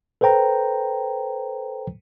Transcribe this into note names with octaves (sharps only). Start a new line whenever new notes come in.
A4 B4 C5 G5 A#5